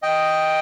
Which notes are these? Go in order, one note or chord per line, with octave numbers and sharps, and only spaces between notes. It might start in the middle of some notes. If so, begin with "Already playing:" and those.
D#5 G5